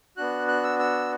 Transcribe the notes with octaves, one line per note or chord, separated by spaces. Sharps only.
B3 D4 F#4 F#6
F#6
E6
E6